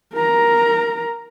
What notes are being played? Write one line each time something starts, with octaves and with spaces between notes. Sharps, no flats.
A#4 A#5